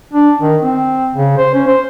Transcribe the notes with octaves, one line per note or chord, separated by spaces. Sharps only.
D4
D#3
C4
C#3
C5
C#4
C5